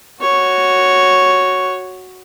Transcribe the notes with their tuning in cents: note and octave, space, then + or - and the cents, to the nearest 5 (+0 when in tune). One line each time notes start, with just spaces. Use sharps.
F#4 +0 C#5 +0